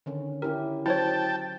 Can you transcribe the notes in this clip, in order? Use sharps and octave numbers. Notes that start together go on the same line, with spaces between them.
D3 D#3 C#4
C#4 E4 G4 A#4
F#3 E4 C5 C#5 G5 A5